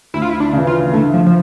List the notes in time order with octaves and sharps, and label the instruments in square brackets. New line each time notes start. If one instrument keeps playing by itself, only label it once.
[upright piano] D2 [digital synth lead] E4
[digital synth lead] F4
E4
D4
[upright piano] C#3 E3
[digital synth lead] F4
[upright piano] D3 [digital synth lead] A3
[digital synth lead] F3
F3